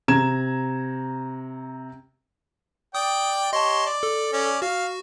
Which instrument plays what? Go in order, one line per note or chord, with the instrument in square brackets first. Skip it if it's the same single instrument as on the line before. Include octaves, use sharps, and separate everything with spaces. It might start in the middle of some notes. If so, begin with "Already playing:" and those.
[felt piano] C3 A#5 G#6 E7
[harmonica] D5 G5 [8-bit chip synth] D#6
[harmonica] G4 C#5 C6 [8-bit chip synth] D#5 A5
[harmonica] D5
[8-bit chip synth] A4
[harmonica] C#4 D5
[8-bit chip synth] F#4 [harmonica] F5